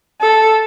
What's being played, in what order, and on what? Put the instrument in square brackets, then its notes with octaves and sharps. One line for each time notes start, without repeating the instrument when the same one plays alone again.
[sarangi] A4